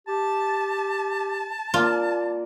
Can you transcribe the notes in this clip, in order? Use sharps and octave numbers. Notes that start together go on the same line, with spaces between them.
G4 A5
A#3 F4 D5